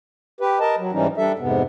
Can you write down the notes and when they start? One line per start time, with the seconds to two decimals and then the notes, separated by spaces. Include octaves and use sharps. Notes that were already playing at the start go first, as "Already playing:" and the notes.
0.41 G4 B4
0.60 A#4 D#5 A5
0.78 F#3
0.92 G#2 E3 G3 C#4 D#4
1.17 G3 D4 A4 E5
1.39 F2 G#2 C3 B3